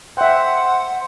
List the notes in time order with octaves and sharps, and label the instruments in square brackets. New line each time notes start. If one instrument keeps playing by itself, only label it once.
[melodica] C5 [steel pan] E5 G5 [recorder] F#5